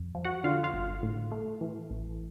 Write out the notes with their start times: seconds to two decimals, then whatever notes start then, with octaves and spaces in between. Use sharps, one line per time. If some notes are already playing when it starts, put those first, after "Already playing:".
Already playing: F2
0.15 F3
0.25 F#4 F#5
0.44 D3 F4 F5
0.64 F4 F5
0.73 G1
1.03 A2
1.31 A3
1.61 E3
1.90 A1